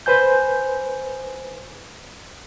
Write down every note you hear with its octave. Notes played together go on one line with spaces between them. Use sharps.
B4 C5 G#5 G6